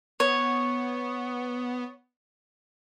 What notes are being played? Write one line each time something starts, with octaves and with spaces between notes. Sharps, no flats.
B3 C#5